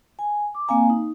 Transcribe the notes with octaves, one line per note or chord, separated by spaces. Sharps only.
G#5
D6
A#3 C4 F5 G#5 A#5
D#4